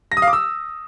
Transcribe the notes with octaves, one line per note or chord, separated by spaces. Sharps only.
A#6
D#6
F5
D6
E6